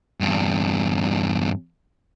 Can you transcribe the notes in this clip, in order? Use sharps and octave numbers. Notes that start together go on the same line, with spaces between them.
E2 G2